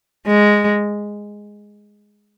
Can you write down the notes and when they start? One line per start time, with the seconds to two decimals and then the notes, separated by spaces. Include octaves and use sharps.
0.26 G#3